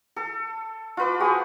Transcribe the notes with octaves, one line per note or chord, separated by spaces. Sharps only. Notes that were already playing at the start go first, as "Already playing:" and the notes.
A4
F4 B4 D6
F#4 G#4 C5